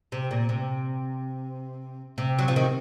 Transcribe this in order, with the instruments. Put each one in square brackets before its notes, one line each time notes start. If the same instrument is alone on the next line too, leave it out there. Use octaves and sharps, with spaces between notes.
[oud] C3
A#2
C3
C3
F#3
F3
D#3